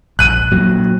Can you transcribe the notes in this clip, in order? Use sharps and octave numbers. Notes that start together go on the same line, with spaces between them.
A#1 F#6 D#7
A#2 F#3